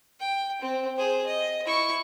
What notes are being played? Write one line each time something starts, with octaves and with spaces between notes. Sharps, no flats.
G5
C4
G#4 C5
D#5
E4 C#6